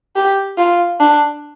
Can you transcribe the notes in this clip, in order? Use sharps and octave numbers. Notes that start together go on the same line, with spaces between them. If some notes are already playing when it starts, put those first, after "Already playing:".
G4
F4
D4